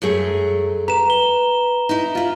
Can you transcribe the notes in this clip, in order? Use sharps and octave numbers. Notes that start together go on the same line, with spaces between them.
F#2 A3 G#4
B4 A#5 E7
G7
D#4 E4
E4 F4